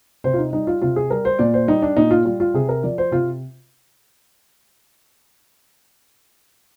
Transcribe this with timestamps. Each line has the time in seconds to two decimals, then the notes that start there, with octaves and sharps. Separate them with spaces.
0.24 C3 C5
0.33 F4
0.38 D#4
0.53 G3 D#4
0.67 F4
0.82 C3 F4
0.96 G#4
1.10 G3 A#4
1.25 C5
1.39 A#2 D5
1.54 C5
1.68 G3 D#4
1.82 D4
1.96 A#2 D#4
2.11 F4
2.25 G3 F4
2.40 F4
2.54 C3 G#4
2.69 A#4
2.83 F3 D5
2.98 C5
3.11 C3 F4